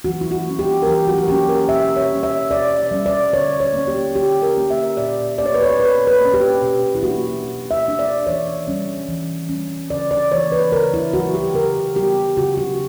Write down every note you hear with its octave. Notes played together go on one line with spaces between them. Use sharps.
E3 F#4
E4
F#4
A#3 C#4
G4
A#4
E3 G4
F#4
F#4
A#3 C#4 G4
A#4
B2 E5
C#5
G3 C#4
E5
B2 D5
E5
G3 C#4
D5
D3 C#5
C#5
A#3 C#4
G4
D3 G4
A#4
A#3 C#4
E5
A#2 D5
A#3 C#4 D5
C#5
B4
C#5
A#2 B4
B4
A#3 C#4
G4
B2
E4
A#3 D4 F#4
B2
E5
A#3 D4
D5
E3 C#5
G3 C#4
E3
G3 C#4
C#3 D5
D5
E3 A#3 C#5
B4
C#3 A#4
E4
E3 A#3 F#4
G4
C#3 A#4
G3 B3 G4
C#3 F#4
F#4